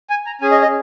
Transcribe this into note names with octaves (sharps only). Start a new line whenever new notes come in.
G#5
A#5
C#4 G#4 G#5
D#5
D#5